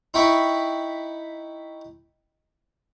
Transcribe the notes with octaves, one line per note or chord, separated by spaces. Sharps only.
D#4 E4 G5 B5 C#6